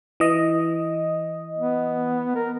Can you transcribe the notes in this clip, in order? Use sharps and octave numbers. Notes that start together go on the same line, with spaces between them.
E3 D#5
B3
A#4